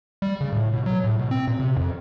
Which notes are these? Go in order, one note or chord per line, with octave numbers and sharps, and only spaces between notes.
G3
C#3
A2
B2
F#3
A2
B2
C4
A#2
C3
F2